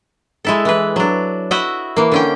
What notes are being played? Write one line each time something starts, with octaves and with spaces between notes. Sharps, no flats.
G#3 E4 A4
E3 B4
F#3 D4
E4 F#4 D#5 E5 F#5
E3 A#3
D3 C#4 G5